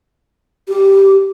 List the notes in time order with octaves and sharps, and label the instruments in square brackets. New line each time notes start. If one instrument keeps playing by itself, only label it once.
[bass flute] G4